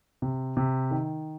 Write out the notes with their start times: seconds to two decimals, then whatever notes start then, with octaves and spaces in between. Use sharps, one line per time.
0.22 C3
0.57 C3
0.91 D#3